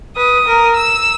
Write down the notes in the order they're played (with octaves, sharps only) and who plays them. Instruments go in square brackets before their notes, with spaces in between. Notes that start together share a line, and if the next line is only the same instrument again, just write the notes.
[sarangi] B4 [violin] D#6
[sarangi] A#4
[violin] E6